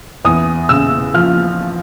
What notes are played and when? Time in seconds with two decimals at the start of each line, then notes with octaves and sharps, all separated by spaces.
0.25 E2 D#6
0.69 C#3 E6
1.14 F3 F6